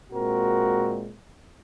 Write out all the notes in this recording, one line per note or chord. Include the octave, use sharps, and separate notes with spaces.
A#2 G#3 C4 F#4 A#4